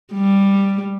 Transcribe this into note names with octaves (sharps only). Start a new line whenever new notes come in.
G3